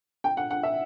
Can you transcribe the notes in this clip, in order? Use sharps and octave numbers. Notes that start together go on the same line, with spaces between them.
G5
F#5
F#5
E5